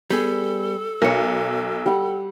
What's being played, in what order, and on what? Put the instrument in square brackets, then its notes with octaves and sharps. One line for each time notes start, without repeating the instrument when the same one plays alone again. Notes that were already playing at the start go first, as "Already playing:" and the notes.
[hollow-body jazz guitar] G3 B3 G#4 [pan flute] A4
[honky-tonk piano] B1 [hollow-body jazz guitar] A#4 C#5
[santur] G3 F#5